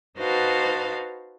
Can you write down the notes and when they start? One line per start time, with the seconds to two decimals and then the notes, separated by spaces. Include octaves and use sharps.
0.18 D#4 F#4 B4 C5 F5 A5